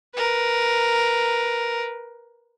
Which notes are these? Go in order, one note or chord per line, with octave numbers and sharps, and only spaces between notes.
A#4 B4